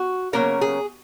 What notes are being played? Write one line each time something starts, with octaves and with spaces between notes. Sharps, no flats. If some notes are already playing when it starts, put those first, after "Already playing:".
Already playing: F#4
C#3 F#3 A#3 C#4 A#4
G#4